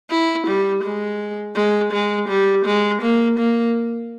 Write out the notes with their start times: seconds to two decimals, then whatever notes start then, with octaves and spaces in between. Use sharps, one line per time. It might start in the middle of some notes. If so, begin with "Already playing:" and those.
0.10 E4
0.47 G3
0.83 G#3
1.56 G#3
1.93 G#3
2.29 G3
2.65 G#3
3.02 A#3
3.39 A#3